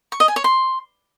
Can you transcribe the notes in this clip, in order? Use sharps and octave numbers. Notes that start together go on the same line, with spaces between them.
C#6
D#5
G#5
C#5
C6